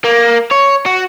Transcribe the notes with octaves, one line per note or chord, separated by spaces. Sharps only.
A#3
C#5
F#4